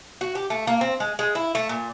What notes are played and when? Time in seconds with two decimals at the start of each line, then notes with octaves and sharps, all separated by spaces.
0.21 F#4
0.35 G4
0.50 A3
0.67 A#3
0.81 C4
1.00 G#3
1.19 G#3
1.35 E4
1.55 A3
1.69 A#2